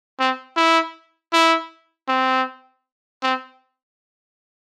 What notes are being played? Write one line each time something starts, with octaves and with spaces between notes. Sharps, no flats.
C4
E4
E4
C4
C4